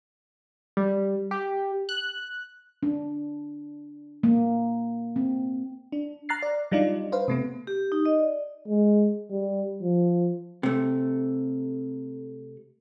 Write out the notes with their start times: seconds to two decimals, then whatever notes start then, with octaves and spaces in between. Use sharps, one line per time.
0.77 G3
1.31 G4
1.89 F#6
2.83 D4
4.23 A#3
5.16 C4
5.92 D4
6.29 A#5 F6 F#6 A6 C7
6.42 D5
6.71 F#3 G3 D4 D#4 F4 D5
7.12 B4 C5 F5
7.28 C3 A3 B3
7.67 G4
7.92 D#4
8.05 D#5
8.19 D5
8.68 G#3
9.31 G3
9.82 F3
10.63 C3 A3